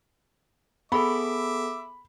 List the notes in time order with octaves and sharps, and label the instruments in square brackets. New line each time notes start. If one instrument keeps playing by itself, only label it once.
[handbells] B3 G#4 A4 [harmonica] E5 D6 [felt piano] B5